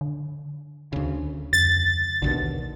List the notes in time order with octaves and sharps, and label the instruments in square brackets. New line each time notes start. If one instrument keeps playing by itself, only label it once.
[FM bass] D3
[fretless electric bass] D2 C#3
[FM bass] F2 [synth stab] A6
[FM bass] A#1 [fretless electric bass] D#2 B2 D3